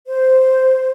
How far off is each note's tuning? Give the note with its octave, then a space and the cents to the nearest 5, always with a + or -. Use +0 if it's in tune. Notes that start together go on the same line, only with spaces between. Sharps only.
C5 -5